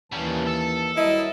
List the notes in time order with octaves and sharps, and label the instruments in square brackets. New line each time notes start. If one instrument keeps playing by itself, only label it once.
[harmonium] D#2 E3 A5 [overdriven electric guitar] C#3 G3
[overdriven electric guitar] A4
[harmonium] F#3 G3 A#4 [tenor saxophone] E4 [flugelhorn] D#5